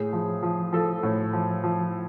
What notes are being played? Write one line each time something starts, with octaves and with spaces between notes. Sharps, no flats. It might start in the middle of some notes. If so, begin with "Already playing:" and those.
Already playing: A2 G#4
F3
F3
F3 A4
A2
F3
F3